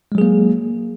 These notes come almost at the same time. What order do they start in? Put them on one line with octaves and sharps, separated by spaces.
G#3 F#3 G#4 A#3